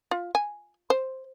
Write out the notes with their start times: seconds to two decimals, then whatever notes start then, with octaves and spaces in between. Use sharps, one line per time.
0.11 F4
0.35 G#5
0.90 C5